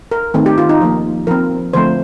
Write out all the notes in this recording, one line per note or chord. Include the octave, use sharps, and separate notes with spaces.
A#4
D#3 A3 C4
G4
F4
D#4
F3 A#3
F3 C4 A#4
D3 F3 A3 C4 C5